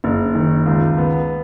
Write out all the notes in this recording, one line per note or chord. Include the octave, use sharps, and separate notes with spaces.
F#1
D#3
C#2
B3